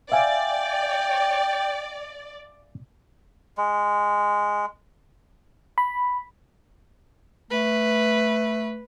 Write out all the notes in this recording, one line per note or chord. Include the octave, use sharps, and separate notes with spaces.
D5 E5 F5 G5 G#5
G#3
B5
A3 B4